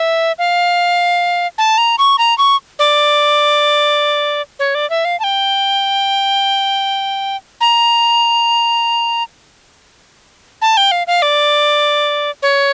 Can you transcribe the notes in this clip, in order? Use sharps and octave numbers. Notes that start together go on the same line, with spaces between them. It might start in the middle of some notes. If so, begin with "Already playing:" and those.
Already playing: E5
F5
A5
A#5
C#6
A#5
C#6
D5
C#5
D5
E5
F5
A5
G5
A#5
A5
G5
F5
F5
D5
C#5